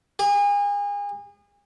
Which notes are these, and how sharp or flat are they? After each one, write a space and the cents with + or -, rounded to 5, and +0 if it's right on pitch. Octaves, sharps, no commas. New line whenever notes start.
G#4 -35